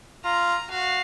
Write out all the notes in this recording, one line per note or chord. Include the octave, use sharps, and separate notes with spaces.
F4 A#5
F#4 F5